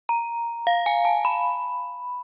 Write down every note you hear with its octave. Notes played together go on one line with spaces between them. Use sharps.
A#5
F5
G#5
A5
B5